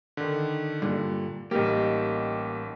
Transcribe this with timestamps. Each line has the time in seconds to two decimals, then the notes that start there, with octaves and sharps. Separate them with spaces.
0.17 D3 D#3
0.82 G2 A#2 D3 G3
1.51 A1 G3 A#3 D#4 G4